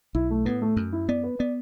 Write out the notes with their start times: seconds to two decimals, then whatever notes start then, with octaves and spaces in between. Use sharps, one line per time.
0.15 B1 E4
0.30 A3
0.45 A2 B3
0.61 A3
0.77 F#2
0.93 E4
1.09 B3 D5
1.24 B4
1.39 B3 D5